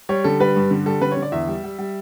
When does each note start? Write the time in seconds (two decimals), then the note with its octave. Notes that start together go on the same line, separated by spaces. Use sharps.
0.09 G3 C#5
0.24 D3 A4
0.40 G3 B4
0.56 G2
0.71 D3
0.86 G3 A4
1.01 D3 B4
1.12 C#5
1.17 D3
1.22 D5
1.32 E2 E5
1.48 G3
1.64 G3
1.79 G3